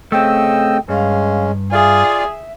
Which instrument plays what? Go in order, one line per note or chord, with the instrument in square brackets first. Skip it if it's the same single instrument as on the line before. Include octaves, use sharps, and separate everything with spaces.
[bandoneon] C#3 D#5 E6 [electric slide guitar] A3 C4 [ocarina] G5
[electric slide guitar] G2 [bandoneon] G#3 C#4 [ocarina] F5
[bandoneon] F4 D5 F5 [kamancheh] G#4 [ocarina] E5